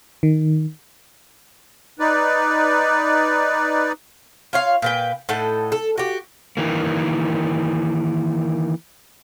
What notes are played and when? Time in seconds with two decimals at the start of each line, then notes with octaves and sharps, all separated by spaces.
0.23 D#3
1.99 D#4 B4 D5
4.53 F4 C#5 F5
4.82 A#2 B4 G5
5.29 A2 D#4 A4 F#5
5.72 A4
5.98 F#4 G4
6.57 D#3 E3 A#3